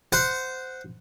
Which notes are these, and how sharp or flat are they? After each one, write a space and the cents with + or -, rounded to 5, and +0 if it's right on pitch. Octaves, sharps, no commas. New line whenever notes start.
C5 -15 F#5 -5